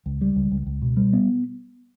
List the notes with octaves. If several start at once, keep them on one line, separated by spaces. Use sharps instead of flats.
C#2
G3
C#2
C#2
C#2
B2
G3
B3